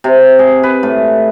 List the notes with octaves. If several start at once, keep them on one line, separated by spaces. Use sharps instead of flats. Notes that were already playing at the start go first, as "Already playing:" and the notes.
C3
G#4
B4
A2